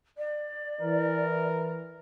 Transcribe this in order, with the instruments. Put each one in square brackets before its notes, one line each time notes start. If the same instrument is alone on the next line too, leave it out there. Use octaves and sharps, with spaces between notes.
[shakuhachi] D5
[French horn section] E3 [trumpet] A#4